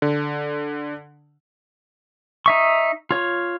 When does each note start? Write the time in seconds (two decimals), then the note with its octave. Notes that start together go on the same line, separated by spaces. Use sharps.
0.02 D3
2.46 D#4 E5 C#6
3.11 F4 C#5